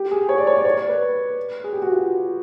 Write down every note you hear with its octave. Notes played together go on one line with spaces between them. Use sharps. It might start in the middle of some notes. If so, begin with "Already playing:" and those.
Already playing: G4
G#4
C#5
D5
C#5
D5
C#5
D5
B4
G#4
G4
F#4
F4